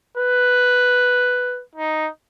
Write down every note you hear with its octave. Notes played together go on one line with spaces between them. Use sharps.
B4
D#4